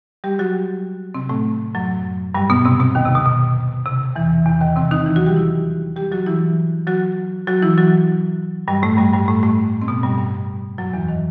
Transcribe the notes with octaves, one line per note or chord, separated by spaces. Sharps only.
G3 G4
F#3 F#4
C3 C4
A2 A3
F#2 F#3
G2 G3
B2 B3
C3 C4
B2 B3
D#2 D#3
C3
B2
B2
C3
E2 E3
E2 E3
D#2 D#3
C3 C4
D#3 D#4
E3 E4
F#3 F#4
G3 G4
E3 E4
G3 G4
F#3 F#4
E3 E4
F#3 F#4
F#3 F#4
E3 E4
F#3 F#4
G2 G3
A2 A3
G2 G3
G2 G3
A2 A3
A2 A3
C4
B2 B3
G2 G3
G2 G3
F#2 F#3
E2 E3
D#3